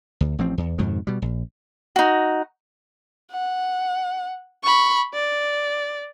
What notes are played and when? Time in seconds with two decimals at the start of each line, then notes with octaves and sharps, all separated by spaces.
0.21 D2
0.39 A1 F3 C4
0.58 E2
0.78 F2 G#2 B2 D#3
1.07 B2 G3
1.22 A#1
1.96 D#4 F#4
3.31 F#5
4.63 B5 C#6
5.14 D5